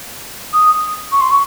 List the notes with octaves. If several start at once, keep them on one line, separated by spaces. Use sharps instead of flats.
D#6
C#6
C6
C#6